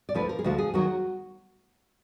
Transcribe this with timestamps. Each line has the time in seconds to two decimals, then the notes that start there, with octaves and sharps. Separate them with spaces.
0.09 D5
0.14 D2 D3 F3 B4
0.29 A#4
0.39 G#4
0.44 D2 D3 F3 F#4
0.58 G#4
0.74 D#2 D#3 F#3 F#4